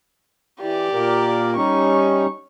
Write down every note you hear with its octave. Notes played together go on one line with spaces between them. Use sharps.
E3 G4 D5
A#2 A#3 A#4
G3 C#4 D#4 C#6